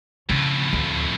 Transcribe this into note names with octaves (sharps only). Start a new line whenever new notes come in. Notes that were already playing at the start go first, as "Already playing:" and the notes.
F2 A2 C#3
D2